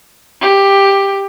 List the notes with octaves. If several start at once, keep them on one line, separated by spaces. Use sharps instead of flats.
G4